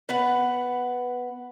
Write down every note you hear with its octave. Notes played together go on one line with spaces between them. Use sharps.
B3 B4 F#5